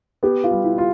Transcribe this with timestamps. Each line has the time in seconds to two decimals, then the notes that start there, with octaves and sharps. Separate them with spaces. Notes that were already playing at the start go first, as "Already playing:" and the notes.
0.23 B3 G4
0.44 F4
0.51 G3
0.64 E4
0.78 F4